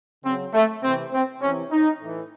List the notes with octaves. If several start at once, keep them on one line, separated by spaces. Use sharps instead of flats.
C#3 F#3 C4
A3
C3 E3 C4
C4
C3 E3 C#4
D#4
A2 E3